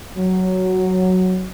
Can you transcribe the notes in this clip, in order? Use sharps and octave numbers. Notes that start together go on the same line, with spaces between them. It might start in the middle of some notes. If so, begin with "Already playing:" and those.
F#3